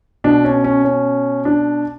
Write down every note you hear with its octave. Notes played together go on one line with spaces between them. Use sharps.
B2 D4
C#4
C#4
C#4
D4